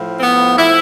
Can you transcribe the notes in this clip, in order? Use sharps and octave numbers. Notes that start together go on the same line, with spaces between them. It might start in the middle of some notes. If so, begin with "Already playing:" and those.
Already playing: A2 F3
C4
B3
A2 F3 E4